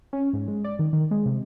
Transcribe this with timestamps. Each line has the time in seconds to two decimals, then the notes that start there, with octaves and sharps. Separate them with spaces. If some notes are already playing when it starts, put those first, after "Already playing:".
0.13 C#4
0.33 G#2
0.48 G#3
0.64 D5
0.79 D#3
0.93 D#3
1.11 G#3
1.26 C3